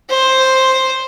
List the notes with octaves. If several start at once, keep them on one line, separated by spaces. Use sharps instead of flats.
C5